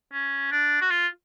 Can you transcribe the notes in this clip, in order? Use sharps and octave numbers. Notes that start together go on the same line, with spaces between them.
C#4
D4
F#4
F4